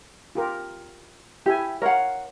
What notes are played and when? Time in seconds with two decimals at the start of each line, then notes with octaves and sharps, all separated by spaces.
0.35 F4 G4 A#4
1.46 E4 G4 E5 G#5
1.82 A#4 C#5 F5 F#5